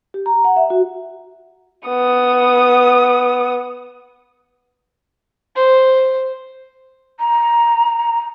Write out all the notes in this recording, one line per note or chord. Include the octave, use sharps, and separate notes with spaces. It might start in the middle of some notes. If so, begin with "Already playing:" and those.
G4
A#5
F#5
E5
F#4
B3 D#6
C5
A#5